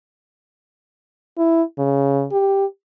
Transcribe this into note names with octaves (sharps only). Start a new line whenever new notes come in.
E4
C#3
G4